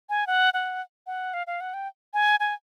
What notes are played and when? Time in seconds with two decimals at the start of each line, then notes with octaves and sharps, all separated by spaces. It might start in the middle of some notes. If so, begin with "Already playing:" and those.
0.10 G#5
0.27 F#5
0.54 F#5
1.07 F#5
1.34 F5
1.47 F5
1.61 F#5
1.74 G5
2.14 G#5
2.40 G#5